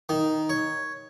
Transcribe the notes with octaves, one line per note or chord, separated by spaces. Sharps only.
D#3
C#5